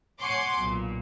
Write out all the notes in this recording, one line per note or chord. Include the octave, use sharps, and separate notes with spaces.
C#5 F#5 G#5 C6 D6
B1 A#2